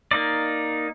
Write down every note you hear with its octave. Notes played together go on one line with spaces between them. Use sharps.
A#3 D#4 D5